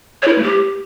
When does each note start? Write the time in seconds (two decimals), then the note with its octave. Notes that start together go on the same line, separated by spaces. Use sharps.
0.22 C#5
0.27 E4
0.33 B4
0.38 A3
0.43 G4